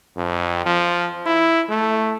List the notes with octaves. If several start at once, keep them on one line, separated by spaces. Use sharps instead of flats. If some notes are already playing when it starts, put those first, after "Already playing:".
F2
F3
E4
A3